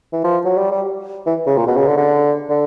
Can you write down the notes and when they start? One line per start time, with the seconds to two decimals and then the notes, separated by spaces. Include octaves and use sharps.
0.13 E3
0.24 F3
0.45 F#3
0.57 G3
0.71 G3
1.26 E3
1.46 C#3
1.57 A#2
1.67 B2
1.77 C#3
1.87 D3
1.97 D3
2.49 D3